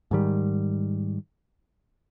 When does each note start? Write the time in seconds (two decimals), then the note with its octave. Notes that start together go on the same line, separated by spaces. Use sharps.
0.11 G#2 D#3 G3